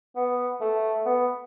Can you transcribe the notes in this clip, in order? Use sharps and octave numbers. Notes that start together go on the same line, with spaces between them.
B3
A3
B3